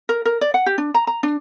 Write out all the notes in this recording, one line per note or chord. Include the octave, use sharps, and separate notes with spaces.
A#4
A#4
D5
F#5
G4
D4
A#5
A#5
D4